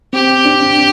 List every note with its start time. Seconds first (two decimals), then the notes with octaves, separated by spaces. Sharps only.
0.13 C4 G4
0.45 D4